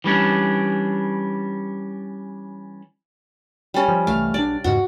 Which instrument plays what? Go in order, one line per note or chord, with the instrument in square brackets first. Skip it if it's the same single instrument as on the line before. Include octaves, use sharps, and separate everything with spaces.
[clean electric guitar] E3 G3 C#4 D4
[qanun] G3 C#4
[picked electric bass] F3
[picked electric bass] C2 E3 A3 [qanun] F5
[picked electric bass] B1 D4 [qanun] D5
[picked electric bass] E2 G#2 C#3 [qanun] F#4